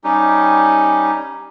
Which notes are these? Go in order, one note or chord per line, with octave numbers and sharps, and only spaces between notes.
G3 C#4 D#4 G4